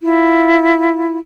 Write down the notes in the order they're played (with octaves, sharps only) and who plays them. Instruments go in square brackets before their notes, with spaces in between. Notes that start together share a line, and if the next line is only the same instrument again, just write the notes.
[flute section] E4 F4